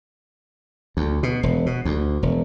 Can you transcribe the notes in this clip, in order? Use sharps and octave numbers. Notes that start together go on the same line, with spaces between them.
D2
B2
E1
B2
D2
E1